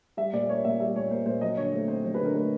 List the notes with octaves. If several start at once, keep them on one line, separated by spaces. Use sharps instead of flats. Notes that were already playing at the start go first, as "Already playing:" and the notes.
G3 E5
A#2 D5
D5
A#3 C#5
A#2 E5
G3 E5
A#2 C#5
A#3 C5
A#2 C5
F#3 D#5
D3 C#5
A3 C5
C4 C5
F#3 C5
B4
D3
A#4
A3 B4